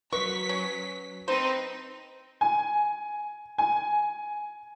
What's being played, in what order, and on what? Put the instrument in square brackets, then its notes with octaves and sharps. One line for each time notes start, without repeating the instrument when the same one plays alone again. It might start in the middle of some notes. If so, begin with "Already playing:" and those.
[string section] F#3 B6 [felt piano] B4 [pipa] C#6
[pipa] C#4
[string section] C4 D#4 B4 [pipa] C5
[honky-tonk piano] G#5
G#5